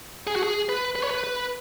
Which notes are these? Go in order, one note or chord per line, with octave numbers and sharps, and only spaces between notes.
G#4
F#4
G#4
B4
B4
C#5
B4
B4